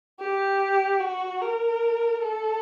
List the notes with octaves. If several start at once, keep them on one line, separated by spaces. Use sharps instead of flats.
G4
F#4
A#4
A4